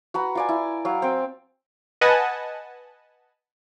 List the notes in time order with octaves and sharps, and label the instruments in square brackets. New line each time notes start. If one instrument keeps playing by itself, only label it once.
[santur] F#4 B4 A#5
F4 D5 G#5
E4
F#3 F5
C4 G5
[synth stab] B4 D#5 F#5 G#5 A5